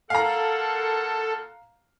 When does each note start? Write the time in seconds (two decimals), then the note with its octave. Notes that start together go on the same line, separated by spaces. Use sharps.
0.10 A#2 A4 A#4 F5 F#5 A#5